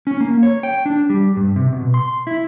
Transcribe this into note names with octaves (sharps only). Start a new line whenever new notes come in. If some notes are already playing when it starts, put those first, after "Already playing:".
C#4
A#3
C#5
G5
D4
G3
G2
C3
B2
C6
E4